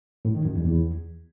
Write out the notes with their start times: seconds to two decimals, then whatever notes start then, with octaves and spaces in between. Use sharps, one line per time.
0.25 A2
0.35 D#3
0.45 F#2
0.55 E2
0.66 E2